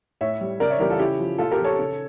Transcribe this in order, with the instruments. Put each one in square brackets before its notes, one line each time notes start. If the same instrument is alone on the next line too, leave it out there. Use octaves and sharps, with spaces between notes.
[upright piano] A2 C#5 E5
G3
C#3 A#4 D5
C#5 E5
E3 G3 G4 A#4
F4 A4
C#3 E4 G4
F3
A#2 F4 A4
G4 A#4
F3
A4 C#5
C#3